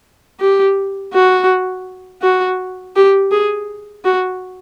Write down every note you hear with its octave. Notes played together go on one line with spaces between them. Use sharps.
G4
F#4
F#4
G4
G#4
F#4